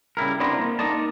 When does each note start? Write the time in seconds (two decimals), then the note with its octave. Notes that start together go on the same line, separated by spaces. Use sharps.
0.17 C#3 G3 E4 A#4
0.40 B3 C4 D4 E4 C5 A#5
0.59 A#3
0.79 A#3 D#4 A#4 D5 D#5 A5